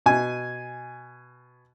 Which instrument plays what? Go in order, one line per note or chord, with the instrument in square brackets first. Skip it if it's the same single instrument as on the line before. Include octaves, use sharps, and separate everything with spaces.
[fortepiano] B2 G#5